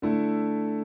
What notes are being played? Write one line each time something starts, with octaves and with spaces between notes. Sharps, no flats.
D3 A3 E4